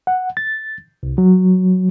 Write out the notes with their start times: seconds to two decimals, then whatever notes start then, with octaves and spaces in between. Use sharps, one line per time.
0.07 F#5
0.37 A6
1.03 C2
1.18 F#3